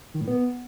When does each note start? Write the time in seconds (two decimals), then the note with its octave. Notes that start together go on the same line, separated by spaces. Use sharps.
0.14 D#3
0.21 A2
0.28 B3